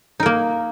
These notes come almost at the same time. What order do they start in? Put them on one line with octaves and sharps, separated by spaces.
D#4 A#4 A#3